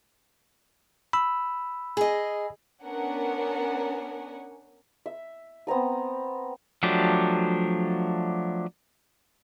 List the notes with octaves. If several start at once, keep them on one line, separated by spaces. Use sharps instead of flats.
B5 E6
G#4 D#5
B3 C#4 D4 A#4 F#5 G#5
E5
B3 C4 A#5 D#6
F3 F#3 A3 D4 G4